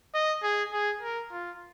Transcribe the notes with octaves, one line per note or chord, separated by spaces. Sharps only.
D#5
G#4
G#4
A#4
F4